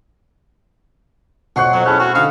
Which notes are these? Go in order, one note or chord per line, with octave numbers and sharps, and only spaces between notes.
F2 B2 C#5 F#5 C6 C#6 F#6
F2 F#3 C4
C#4 E4 G#4 A5 B5 F#6
A2 C4 F#4
D3 D#4 F5 C#6 D#6